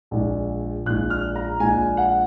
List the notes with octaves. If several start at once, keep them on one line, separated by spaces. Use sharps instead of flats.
A#1 A#2 G#3
A#1 A#2 G#3 F#6
F6
A#5
A#1 A#2 G#3 G#5
F#5